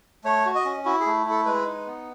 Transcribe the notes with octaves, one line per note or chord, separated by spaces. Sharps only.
A3 C#5
F#4
D#5
C#4
E4 F#4
G#4
A3
E4 A4
G#3 B4
D#4
B3